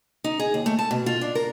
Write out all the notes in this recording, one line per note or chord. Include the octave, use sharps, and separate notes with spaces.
D#4
G#4
D#2
A3
A5
B2
F4
D4
A#4